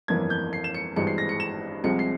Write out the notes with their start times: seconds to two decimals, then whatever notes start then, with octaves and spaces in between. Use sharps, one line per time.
0.08 G1 F2 E3 A#3 G#6
0.30 G6
0.53 C7
0.64 E7
0.74 C#7
0.96 G#1 G2 E3 G#3 C#7
1.07 C7
1.18 A#6
1.29 C#7
1.40 E7
1.84 C2 C3 F3 G#3 C#7
1.99 C7